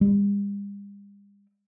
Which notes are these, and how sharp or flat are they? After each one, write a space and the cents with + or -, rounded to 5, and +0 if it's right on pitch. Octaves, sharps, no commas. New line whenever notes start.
G3 +45